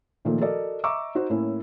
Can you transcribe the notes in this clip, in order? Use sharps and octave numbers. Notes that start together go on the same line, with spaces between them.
A#2 D#3 F3 A3 A#3
F#4 A4 A#4 D5 D#5
D#5 E5 A#5 C#6 D6 E6
D#4 F#4 C5
A2 A#3 C#4 E4